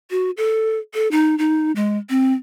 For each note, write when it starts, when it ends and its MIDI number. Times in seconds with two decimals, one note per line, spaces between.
0.11 0.31 66
0.37 0.79 69
0.94 1.10 69
1.11 1.37 63
1.38 1.72 63
1.76 1.98 56
2.10 2.33 60